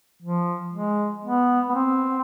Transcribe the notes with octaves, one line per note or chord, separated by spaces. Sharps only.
F3
G#3
B3
B3
C4